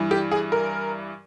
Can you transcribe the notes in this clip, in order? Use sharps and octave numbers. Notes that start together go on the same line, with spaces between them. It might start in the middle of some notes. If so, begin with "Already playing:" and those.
Already playing: G2 E3
G4
G#4
A#4